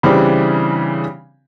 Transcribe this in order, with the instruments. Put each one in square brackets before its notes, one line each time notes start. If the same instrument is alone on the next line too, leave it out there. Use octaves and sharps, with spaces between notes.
[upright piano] C#3 E3 G3 C4 D4